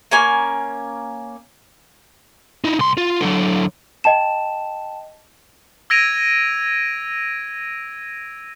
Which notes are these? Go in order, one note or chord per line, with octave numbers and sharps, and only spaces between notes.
A#3 C#4 G#5
D#4 E4
C2 C6
F4
D3 F#3
D#5 G5 A5 E7
E6 G#6 A#6 D7 D#7 F7